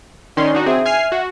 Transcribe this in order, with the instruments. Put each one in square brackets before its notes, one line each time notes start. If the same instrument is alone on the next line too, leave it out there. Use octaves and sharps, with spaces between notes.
[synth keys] D#3 C#4 C6 [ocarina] D5
[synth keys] D4 D#4 F#4
[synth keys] C4 G#4 [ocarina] E5
[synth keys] G#5 F6 C7
F#4